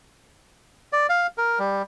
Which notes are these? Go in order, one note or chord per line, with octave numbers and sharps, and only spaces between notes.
D5
F5
A#4
G3